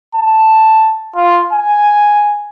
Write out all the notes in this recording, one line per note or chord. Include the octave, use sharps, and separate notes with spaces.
A5
F4
G#5